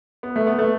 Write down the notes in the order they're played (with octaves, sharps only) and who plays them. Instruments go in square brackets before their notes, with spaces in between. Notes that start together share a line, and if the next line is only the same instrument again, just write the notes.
[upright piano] B3
A3
B3
A3